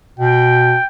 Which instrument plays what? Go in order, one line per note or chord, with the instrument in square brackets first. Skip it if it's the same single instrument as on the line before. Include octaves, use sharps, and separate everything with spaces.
[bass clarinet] B2 [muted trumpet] G5